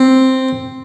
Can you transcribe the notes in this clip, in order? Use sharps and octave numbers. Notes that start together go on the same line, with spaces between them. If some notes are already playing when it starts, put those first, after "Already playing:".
Already playing: C4